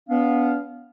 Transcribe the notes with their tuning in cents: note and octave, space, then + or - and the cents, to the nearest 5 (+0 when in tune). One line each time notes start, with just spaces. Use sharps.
B3 +0 D4 -40 F5 +0